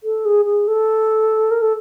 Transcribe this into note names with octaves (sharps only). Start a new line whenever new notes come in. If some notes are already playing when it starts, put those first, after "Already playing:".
A4
G#4
G#4
A4
A#4
A4